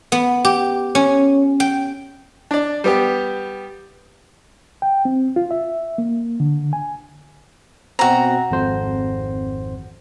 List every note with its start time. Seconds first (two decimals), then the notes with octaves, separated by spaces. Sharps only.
0.12 B3
0.45 G4
0.95 C#4
1.60 G5
2.51 D4 D5
2.84 G3 B3 G4
4.82 G5
5.05 C4
5.36 F4
5.51 E5
5.98 A#3
6.40 D3
6.73 G#5
7.99 B2 C4 F#4 A#5
8.51 G#1 F2 C5